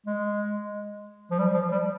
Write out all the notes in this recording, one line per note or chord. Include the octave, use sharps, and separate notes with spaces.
G#3
F3
G3
F3
G3